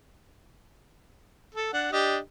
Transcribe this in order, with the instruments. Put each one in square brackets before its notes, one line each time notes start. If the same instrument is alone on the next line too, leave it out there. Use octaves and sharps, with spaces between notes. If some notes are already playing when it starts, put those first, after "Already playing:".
[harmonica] A4
D4 F#5
D4 G4 D#5